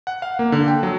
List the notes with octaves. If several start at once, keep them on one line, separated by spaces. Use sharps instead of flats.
F#5
F5
A#3
D3
G5
F#3